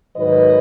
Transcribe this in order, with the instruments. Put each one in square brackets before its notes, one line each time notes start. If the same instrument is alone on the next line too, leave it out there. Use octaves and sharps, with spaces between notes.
[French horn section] G#2 D#3 F#3 B4 D#5